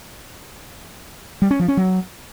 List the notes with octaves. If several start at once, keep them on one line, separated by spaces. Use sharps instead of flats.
G3
C#4
F3
C#4
F#3